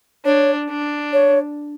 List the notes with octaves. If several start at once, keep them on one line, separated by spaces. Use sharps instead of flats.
D4 C#5
D4
C#5